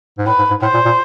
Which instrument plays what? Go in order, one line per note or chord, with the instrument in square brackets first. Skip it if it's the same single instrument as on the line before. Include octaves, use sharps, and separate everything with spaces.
[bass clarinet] G#2
[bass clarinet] A2 [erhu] B4
[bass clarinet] G#2
G#2
[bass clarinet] A2 [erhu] C5
[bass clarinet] A#2
A#2